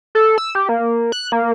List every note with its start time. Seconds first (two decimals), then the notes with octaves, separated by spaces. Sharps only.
0.15 A4
0.38 E6
0.55 G4
0.69 A#3
1.12 F#6
1.32 A#3